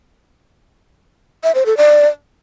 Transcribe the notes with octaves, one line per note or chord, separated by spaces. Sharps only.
E5
C5
A4
D5